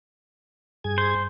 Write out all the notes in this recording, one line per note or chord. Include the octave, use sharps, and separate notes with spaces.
G2 G#4 G#6
C5